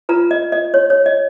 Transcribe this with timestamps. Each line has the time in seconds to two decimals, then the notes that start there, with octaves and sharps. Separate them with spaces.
0.09 F4 B4 A#5
0.31 D#5
0.52 D#5
0.74 C#5
0.90 C#5
1.06 D#5